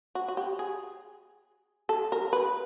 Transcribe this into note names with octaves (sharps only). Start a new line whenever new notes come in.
F#4
F#4
G4
G#4
A4
A#4
B4